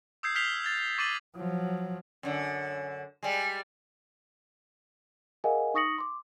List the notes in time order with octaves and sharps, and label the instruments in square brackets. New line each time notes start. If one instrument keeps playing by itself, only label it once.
[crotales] D#6 E6 G6 G#6 C7
F6 G6 B6 C7 F7 G7
G#6 A6
C#6 D6 A6 C7 D#7 F#7
[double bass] F3 F#3
[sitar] F#2 D3
G3 G#3
[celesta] G#4 A#4 D#5 F5 F#5 G#5
D#4 C#6 D#6 A#6 C#7 F#7
C6 D6